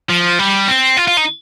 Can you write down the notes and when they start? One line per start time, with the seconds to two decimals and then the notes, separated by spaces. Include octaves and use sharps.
0.10 F3
0.39 G3
0.68 C4
0.97 F4
1.08 F4
1.17 D#4